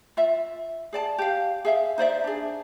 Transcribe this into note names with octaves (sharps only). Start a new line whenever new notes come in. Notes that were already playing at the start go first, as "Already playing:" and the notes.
F4 E5
G#4 D5 A5
G4 F5
G#4 E5 F5
D#4 C5 D5 E5
D4 G#4